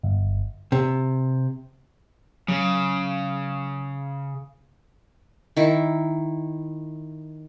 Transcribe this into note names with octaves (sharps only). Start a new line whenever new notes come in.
G1
C3
C#3 F#3
D#3 E4